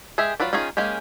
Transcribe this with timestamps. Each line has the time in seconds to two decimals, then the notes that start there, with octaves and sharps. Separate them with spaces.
0.18 G#3 G4 G#4 E5
0.40 F#3 F4 B4 D5
0.53 D#3 C#4 F4 G#4 A#5
0.77 G#3 A#3 C#4 G4